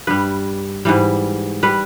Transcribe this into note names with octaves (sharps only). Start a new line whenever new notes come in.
G2 G3 B4
G#2 E3 G3
G3 B4